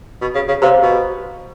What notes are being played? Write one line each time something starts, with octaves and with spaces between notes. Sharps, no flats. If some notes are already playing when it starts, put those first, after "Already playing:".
B2
C#3
C#3
C3 C5 F5 A#5
B2